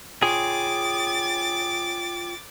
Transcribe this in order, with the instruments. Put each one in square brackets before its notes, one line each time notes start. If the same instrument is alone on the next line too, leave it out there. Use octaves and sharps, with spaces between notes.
[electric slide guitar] F4 C#5 G5 [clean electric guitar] G#4 [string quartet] D6 A6